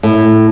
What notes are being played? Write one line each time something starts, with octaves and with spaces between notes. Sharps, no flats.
A2